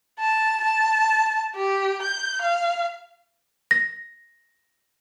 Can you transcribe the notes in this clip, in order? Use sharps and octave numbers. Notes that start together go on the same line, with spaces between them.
A5
A5
G4
G6
F5
A#6